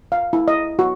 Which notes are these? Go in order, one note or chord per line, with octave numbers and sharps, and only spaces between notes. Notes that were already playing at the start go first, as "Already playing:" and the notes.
F5
E4
D#5
F#4